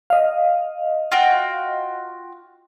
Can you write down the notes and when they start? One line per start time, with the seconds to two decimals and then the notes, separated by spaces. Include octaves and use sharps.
0.10 D#5 F5
1.12 F4 F#4 G5